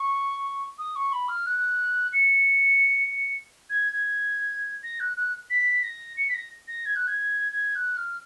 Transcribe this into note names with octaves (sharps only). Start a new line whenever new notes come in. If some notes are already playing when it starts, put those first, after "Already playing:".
Already playing: C#6
D#6
C#6
B5
F6
F#6
C#7
G#6
G#6
A#6
F#6
F#6
B6
A#6
C#7
B6
A#6
A#6
G#6
F#6
G#6
G#6
F#6
F6